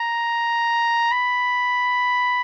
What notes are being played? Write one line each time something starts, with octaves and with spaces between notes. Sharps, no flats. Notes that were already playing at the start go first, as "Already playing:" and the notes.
Already playing: A#5
B5